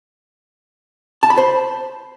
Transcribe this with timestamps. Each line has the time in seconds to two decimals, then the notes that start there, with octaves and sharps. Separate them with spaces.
1.23 A5
1.30 B5
1.38 C5